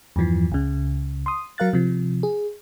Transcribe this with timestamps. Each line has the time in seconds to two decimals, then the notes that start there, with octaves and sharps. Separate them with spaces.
0.16 E2 G2 E3 F3
0.52 C#2 C#3
1.26 C6 D#6
1.58 F#3 A#4 F5 F#6 A6
1.73 C3 F3
2.23 G#4